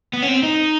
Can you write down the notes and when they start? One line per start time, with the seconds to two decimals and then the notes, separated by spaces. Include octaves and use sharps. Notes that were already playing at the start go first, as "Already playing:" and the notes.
0.13 B3
0.22 C#4
0.28 C4
0.43 D#4